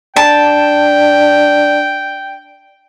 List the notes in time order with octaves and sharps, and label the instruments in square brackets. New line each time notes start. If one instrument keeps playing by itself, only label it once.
[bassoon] D4 [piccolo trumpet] G5 [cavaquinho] A5